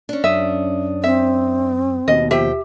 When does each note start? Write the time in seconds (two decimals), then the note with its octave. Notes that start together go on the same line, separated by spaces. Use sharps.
0.09 C#4 D4
0.24 F#2 E5 D#6
1.04 C4 E5
2.08 D#2 B2 D#5
2.31 F3 G4 E5 G5